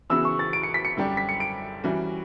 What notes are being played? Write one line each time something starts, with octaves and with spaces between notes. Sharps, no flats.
C#3 E3 B3 F#4 E6
C#6
A6
D7
C#7
B6
C#7
F#2 D3 G3 D4 G4
B6
C#7
D7
E3 G3 C#4 F#4